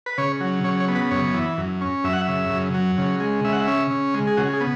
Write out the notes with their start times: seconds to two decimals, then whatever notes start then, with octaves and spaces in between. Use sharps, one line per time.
0.06 B4
0.18 C#3 C#5
0.41 F#3
0.64 C#3 C#5
0.80 C#5
0.88 B3
0.95 B4
1.11 F#2 C#5
1.34 E3
1.58 F#2
1.81 C#4
2.04 F#2 E5
2.13 F#5
2.21 E5
2.28 C#3
2.50 F#2
2.74 F#3
2.98 C#3
3.20 G#3
3.45 C#3 E5
3.53 F#5
3.60 E5
3.68 C#4
3.91 C#3
4.14 G#3
4.27 G#4
4.37 C#3 F#4
4.53 G#4
4.61 B3